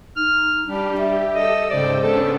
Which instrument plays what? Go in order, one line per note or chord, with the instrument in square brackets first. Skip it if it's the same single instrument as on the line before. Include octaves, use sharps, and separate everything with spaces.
[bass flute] D#4 [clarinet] F6
[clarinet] G3 [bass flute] D4 [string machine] G4
[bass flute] E5
[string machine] A4 E6 [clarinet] D#5
[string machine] G#2 C#3 G5 [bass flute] C5 [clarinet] D5
[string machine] B3 C#4 D4 [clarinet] A4